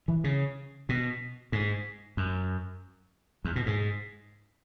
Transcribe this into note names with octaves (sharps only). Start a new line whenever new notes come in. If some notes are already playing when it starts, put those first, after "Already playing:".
E3
C#3
B2
G#2
F#2
E2
B2
G#2